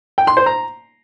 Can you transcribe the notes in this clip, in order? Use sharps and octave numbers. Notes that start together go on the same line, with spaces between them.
G5
C6
C5
A#5